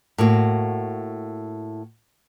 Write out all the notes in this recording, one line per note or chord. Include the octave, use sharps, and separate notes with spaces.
A2 A#3 F#4